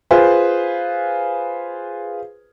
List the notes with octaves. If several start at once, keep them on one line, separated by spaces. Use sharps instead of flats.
F4 G#4 B4 C5